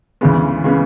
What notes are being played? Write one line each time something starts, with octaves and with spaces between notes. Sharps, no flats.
D2 C#3 E3 G#3 B3
C#3 E3 G#3 B3